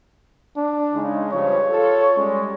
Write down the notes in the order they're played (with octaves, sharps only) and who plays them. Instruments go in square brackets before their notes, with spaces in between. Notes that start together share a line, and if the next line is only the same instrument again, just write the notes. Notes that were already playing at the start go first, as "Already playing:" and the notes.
[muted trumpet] D4
[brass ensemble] C#3 G#3 D#4
[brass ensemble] G2 C#3 F3 [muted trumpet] C#5
[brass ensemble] F4 A4
G3 G#3 C#4